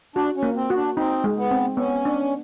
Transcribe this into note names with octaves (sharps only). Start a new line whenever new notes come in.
D4 F#4
C#4
A#3
C4
F#4
D4
C4 D#4
G#3
B3
C4
B3 C#4
D4